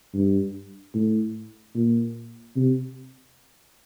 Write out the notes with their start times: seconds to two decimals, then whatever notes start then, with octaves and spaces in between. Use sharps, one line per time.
0.14 G2
0.94 A2
1.75 A#2
2.56 C3